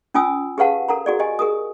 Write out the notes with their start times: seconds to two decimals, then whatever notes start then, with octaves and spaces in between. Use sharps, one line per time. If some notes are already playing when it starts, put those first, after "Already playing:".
0.14 C#4 F4 G#5 D#6 E6
0.58 G4 G#4 B4 F5 F#5 A5
0.88 A4 A#4 F#5 A#5
1.06 F#4 G#4 D5
1.19 G4 D#5 G#5
1.39 G#4 A#4 D#6